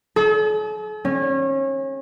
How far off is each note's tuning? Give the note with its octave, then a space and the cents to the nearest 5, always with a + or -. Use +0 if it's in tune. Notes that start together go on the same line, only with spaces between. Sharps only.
A4 -45
C#4 -30